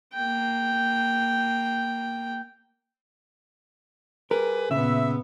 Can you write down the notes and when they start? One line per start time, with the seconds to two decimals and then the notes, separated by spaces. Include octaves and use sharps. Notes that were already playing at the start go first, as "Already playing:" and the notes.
0.13 A#3 G5
4.31 G3 G#4 A#4 B4
4.71 A#2 C#3 B3 E5